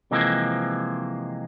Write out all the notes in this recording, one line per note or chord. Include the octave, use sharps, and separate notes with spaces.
C3 E3 F3 G#3 A#3 C4